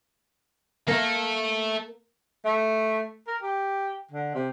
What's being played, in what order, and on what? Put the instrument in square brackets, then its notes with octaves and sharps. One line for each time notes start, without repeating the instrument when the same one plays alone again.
[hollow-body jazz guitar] A#3 [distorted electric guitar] A4 E5
[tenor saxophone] A3
A#4
G4
D3
C3